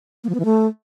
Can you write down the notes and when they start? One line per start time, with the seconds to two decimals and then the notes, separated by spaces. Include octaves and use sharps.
0.24 A#3
0.29 F3
0.34 B3
0.40 E3
0.45 A3